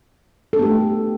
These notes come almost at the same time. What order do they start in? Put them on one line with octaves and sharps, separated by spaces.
A4 D4 B3 G4 A3